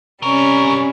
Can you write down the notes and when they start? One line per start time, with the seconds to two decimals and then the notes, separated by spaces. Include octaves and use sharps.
0.23 G2 C3 G3 C#4 A#4 C#6